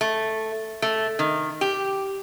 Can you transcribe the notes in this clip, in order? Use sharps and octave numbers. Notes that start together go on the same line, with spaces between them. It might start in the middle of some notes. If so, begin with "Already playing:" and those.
A3
A3
D#3
G4